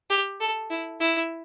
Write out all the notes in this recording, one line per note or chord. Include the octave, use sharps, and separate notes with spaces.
G4
A4
E4
E4